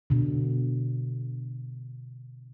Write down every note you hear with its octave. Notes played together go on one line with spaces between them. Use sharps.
B2 D3